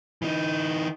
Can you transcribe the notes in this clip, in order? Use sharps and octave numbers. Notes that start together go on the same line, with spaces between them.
E3 D#4